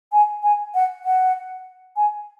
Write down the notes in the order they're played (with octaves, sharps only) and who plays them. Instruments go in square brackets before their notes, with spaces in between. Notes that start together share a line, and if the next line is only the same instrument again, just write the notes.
[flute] G#5
G#5
F#5
F#5
G#5